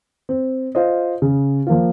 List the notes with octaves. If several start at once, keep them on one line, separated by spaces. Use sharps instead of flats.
C4
F4 C5 D#5
C#3
F3 A#3 F4